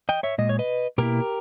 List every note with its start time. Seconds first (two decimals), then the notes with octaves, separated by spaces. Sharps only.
0.09 D#5 G5
0.23 C#5 E5
0.38 A#2 G#3 D#5
0.49 C#5
0.59 B4 D#5
0.98 B2 A#3 E4 G4 A#4